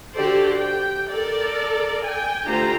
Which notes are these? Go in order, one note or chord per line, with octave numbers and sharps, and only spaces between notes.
D3 F#4 G4 A4 C5 D5
G5
A4 A#4 D5
G5 G#5
D3 A3 F4 G4 C5 A#5